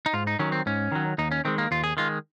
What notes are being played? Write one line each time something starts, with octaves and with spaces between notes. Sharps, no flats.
D#4
G#2 F4
D#4
D#3 F#3 C#4
C4
G#2 C#4
D#3 F#3
D#2 D#4
C#4
D#3 G#3 C4
A#3
D#2 F4
G#4
D#3 G#3 F4